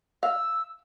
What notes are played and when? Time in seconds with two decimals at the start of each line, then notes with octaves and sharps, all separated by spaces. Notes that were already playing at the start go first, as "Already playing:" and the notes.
0.23 F5 E6